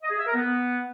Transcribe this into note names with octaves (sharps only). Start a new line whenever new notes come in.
D#5
G#4
E5
A#4
B3